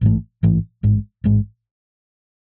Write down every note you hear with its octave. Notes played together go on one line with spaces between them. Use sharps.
A1 G#2 E3 A3
A1 G#2 E3 A3
A1 G#2 G#3
A1 G#2 G#3